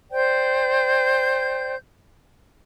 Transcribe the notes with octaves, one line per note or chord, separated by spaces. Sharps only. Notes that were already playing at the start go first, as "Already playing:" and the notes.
C5 D5 G5 G6